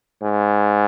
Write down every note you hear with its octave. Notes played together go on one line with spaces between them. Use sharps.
G#2